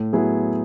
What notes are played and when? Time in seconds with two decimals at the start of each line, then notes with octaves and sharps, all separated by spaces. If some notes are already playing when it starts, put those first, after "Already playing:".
Already playing: A2
0.13 F#3 B3 E4 G#4